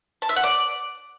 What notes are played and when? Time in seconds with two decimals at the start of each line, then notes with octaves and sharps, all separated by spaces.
0.22 A5
0.29 E5
0.36 F#5
0.44 D5